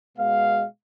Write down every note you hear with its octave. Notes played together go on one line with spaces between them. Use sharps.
B2 G#3 B3 F5